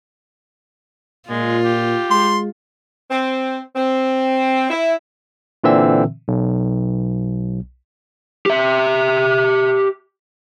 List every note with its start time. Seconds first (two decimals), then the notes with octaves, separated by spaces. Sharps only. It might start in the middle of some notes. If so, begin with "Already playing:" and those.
1.30 A#2 G#3 F4
1.65 G4
2.11 G#3 C6
3.11 C4
3.76 C4
4.70 E4
5.64 A#2 D3 E3 C4 E5 E6
6.28 B1
8.46 G4 E5